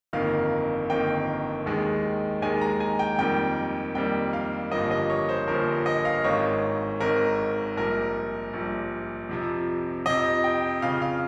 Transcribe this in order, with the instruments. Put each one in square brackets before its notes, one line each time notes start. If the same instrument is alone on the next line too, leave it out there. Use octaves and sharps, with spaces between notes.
[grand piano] G1 F2 D#3 A#3 F5
G1 F2 D#3 A#3 G5
D#2 D#3 G#3
D#2 D#3 G#3 G#5
A#5
G#5
G5
F2 D#3 G3 A#3 G5
F2 D#3 G3 A#3 G5
F5
G1 G2 F3 A#3 D#5
D#5
C#5
C5
G1 G2 F3 A#3 A#4
D#5
F5
G#1 G#2 D#3 C#5
G#1 G#2 D#3 A#4
A#1 A#2 G3 A#4
A#1 A#2 G3
F2 C3 F3
F2 C3 F3 D#5
G5
F2 C#3 F3 F5
F5